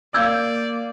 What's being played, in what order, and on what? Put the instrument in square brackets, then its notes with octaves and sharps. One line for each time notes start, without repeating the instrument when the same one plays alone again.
[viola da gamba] A#3 [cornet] D5 [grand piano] F5 G6 G#6 [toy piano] E6